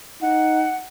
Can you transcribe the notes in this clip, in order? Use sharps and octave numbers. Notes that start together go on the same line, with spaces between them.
D#4 F#5